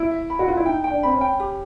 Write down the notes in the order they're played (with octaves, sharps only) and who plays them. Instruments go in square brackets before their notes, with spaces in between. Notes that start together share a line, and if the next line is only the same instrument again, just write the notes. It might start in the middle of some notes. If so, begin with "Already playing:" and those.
Already playing: [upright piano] E4
[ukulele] E5
B5
[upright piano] F#4
[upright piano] F4 [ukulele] B4
[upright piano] E4
[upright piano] D#4 [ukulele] G5
[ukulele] G5
[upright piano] D4
[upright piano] C4 [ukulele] B5
[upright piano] C#4
[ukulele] G5
G4